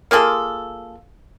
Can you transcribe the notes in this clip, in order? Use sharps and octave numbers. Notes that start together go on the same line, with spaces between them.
A#3 F4 G#4 A4